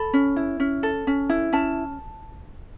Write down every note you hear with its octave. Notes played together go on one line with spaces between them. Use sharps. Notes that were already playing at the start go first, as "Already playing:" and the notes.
Already playing: A4 B5
C#4
E4
C#4
A4
C#4
E4
C#4 A5